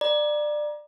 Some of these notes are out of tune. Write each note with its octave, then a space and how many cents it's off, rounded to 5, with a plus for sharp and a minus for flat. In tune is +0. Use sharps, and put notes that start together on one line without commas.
D5 +20 A#5 +25